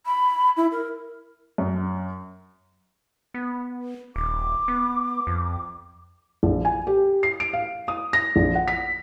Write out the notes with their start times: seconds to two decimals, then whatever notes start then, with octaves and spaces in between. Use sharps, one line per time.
0.06 B5
0.57 E4
0.72 A#4
1.58 F#2
3.34 B3
4.16 D#1 D6
4.68 B3
5.27 F2
6.43 A#1
6.65 G#5
6.87 G4
7.23 C7
7.40 D7
7.53 F5
7.88 D#6
8.13 A#6
8.36 A#1
8.55 F#5
8.68 B6